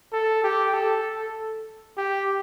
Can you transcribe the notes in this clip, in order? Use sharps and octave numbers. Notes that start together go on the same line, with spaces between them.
A4
G4
A4
G4